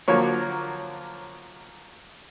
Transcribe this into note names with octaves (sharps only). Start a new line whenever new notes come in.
D3 F3 F#3 A#3 C#5